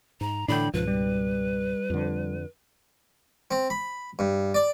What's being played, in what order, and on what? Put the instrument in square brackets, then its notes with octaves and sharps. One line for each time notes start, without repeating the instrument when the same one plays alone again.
[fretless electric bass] G#2 [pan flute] A#5
[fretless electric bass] A2 D3 E3 [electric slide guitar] D4 G5 [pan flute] B5
[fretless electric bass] C#2 G#2 B2 [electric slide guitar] F3 [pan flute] B4
[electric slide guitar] G3
[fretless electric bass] F2 D3
[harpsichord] C4
B5
G2
D5